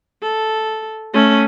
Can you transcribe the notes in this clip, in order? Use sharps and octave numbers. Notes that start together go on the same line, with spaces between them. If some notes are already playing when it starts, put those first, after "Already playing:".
A4
A3 C#4